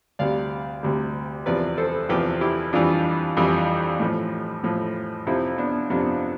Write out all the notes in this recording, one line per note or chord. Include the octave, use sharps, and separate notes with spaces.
D2 C3 G3 D5 F5
D2 C3 G3
E2 C3 F3 B4 D5
A4 C5
E2 C3 F3 G4 B4
E4 G4
F2 E3 G3 D4 F4
F2 E3 G3
A2 F3
A2 F3
F2 C3 F3 C4 E4
B3 D4
F2 C3 F3 B3 D4